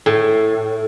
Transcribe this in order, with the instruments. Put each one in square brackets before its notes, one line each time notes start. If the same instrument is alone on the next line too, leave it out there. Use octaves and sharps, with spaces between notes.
[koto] A2